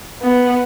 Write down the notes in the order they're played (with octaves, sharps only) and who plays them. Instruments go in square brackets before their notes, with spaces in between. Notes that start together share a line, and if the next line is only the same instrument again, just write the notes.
[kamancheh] B3